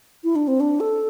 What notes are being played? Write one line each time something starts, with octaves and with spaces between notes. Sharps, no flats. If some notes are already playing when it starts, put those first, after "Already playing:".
E4
D4
C4
D4
A4